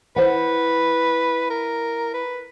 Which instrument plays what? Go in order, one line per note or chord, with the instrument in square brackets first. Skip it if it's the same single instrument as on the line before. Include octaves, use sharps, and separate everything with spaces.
[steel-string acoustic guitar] E4 C5 F#5 [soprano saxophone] B4
[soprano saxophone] A#4
B4